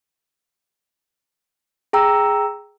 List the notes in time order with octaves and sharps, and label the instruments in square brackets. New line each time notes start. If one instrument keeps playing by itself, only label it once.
[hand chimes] G#4 G5 A#5 E6